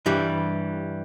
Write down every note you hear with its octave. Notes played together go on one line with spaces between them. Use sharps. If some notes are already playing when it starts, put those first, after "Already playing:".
G2 E3 G3